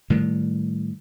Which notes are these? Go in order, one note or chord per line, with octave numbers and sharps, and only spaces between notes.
A2 D#3 G3